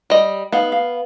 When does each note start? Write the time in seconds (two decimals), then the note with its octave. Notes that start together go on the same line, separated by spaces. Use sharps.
0.10 G3 D#5
0.52 B3 D#4 F5
0.72 F5